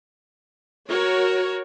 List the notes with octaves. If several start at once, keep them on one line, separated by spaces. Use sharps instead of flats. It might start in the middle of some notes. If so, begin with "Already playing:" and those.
F#4 A#4 C#5